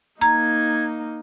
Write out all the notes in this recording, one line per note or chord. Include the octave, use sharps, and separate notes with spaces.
A#3 D#4 A#5 G#6